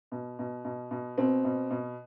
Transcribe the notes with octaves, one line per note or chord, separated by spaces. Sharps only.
B2
B2
B2
B2
B2 C4
B2
B2